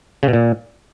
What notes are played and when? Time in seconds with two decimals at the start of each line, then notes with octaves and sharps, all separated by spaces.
0.23 C#3
0.28 B2
0.33 A#2